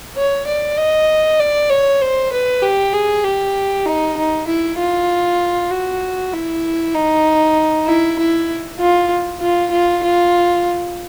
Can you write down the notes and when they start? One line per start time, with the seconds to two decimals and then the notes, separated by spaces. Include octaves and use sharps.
0.16 C#5
0.46 D5
0.78 D#5
1.39 D5
1.70 C#5
2.01 C5
2.32 B4
2.62 G4
2.93 G#4
3.24 G4
3.86 D#4
4.18 D#4
4.47 E4
4.78 F4
5.71 F#4
6.33 E4
6.94 D#4
7.86 E4
8.18 E4
8.79 F4
9.41 F4
9.71 F4
10.03 F4